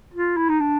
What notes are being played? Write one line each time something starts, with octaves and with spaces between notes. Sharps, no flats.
F4
E4
D#4
D4